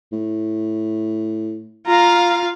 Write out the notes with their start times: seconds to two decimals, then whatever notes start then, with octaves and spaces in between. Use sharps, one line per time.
0.12 A2
1.87 F4 F5 A#5